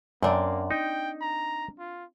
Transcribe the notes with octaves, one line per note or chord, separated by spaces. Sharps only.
F#2 A#3 C4 D4
D#4 G5
A#5
F4